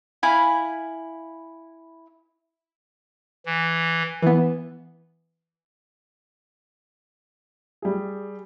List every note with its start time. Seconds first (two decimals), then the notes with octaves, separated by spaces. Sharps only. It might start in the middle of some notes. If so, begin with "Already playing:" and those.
0.23 E4 F5 G#5 B5
3.46 E3
4.22 E3 B3
7.82 G3 G#4